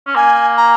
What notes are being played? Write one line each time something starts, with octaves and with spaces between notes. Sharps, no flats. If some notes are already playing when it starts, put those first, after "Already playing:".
C#4
A#3 G#5
A#5